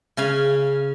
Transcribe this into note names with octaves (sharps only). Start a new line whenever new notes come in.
C#3 C#4 F5 G#5